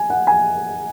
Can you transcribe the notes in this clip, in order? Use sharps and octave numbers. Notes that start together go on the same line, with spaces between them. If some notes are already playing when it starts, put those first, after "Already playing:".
Already playing: G#5
F#5
G#5